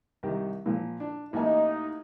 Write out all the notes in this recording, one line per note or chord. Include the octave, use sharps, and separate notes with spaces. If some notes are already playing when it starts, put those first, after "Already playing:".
C2 D#3 G4
A#2 F3
D4
A1 A#3 D#4 G#5